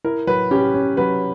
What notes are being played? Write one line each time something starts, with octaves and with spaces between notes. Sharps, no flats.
E4 A#4
F#3 B4
C#4 G4
C#4
F#3 B4